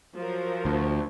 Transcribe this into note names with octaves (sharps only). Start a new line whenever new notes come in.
F3 F#3 A#4
D2